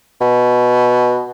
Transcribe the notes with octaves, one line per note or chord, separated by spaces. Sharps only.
B2